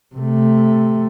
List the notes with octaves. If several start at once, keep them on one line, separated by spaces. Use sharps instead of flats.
C3 A3